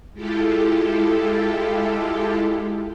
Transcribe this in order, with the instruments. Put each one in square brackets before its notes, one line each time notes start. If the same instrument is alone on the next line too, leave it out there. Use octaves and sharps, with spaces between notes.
[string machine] G#3 E4 F4 G4 A4